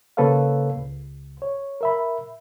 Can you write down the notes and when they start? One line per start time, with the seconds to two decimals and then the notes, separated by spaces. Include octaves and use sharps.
0.17 C#3 A#3 A4 B4 C#5 F5
0.77 C#2
1.42 C#5
1.81 A#4 E5 B5